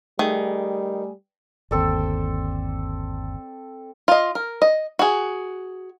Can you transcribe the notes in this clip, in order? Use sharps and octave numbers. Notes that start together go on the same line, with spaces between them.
D#3 G3 A3 G#4
G1 D#2 C4 A4 D5
F4 D#5
A#4
D#5
F#4 G#4